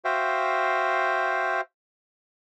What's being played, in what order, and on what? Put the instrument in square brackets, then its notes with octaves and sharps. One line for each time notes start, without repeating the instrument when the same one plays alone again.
[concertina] F#4 C5 E5 F5 G5